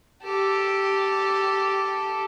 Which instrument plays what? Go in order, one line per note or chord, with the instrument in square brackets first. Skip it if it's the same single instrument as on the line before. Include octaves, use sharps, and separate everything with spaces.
[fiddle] G4 A4